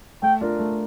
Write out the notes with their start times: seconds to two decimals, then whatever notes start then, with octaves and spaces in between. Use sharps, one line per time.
0.22 A3 G5
0.41 D4 F4 A#4
0.59 A3